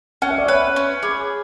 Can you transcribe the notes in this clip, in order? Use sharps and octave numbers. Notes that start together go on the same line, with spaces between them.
C#4 F#5
E5
D5
B4 C#5 E5
C#4
G#4 B5 D6